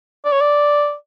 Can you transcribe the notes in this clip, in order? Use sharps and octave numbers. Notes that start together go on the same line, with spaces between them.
D5
C#5
D5